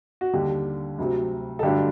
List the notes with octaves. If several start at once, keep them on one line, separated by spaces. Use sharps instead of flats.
F#4
D#2 D3 G3 D4 G4
D2 C3 F#3
A4
G2 D3 F#3 A3 D4 G4